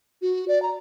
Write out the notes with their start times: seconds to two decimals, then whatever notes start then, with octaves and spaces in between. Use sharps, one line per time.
0.22 F#4
0.48 D5
0.63 A#5